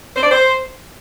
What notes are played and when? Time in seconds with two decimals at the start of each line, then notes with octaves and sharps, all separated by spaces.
0.15 C5
0.22 D5
0.30 C5